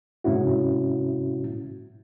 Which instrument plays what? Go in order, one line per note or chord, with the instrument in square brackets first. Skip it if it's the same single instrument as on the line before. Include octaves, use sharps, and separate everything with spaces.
[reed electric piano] G#2 C3 C#4 E4 F#4